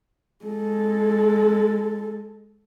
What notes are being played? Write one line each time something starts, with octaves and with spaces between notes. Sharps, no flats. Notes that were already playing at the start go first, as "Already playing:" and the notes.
G#3 A4